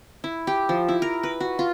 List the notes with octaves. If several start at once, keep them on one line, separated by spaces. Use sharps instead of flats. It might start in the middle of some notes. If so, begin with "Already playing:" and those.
E4
G4
F3
E4
A#4
B4
F#4
F4